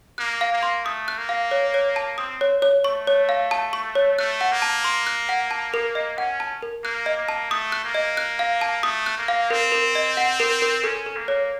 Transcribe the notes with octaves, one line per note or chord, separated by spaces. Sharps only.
A#3 F#6
F5
A#3
C6
A3 D#6
F#6
A#3
F5
C#5
C#5
A5
C4 D#6
C#5
C#5
A3 C#6
C#5
F5
A5
C#6
C#5
A3 F#6
F#5
A#3
A5
C6
F#6
F#5
A5
A#4
D#5
C#4 F#5
A5
A#4
A#3 F#6
D#5
A#3
A5
A3 D#6
F#6
A#3
D#5
F#6
F5
A5
A3 D#6
F#6
A#3
F5
C4 A#4
A#4
D#5
F#5
A#4
A#4
C#4 A4
A4
A#3
C#5